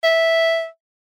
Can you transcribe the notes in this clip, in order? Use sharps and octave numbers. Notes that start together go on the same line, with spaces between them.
E5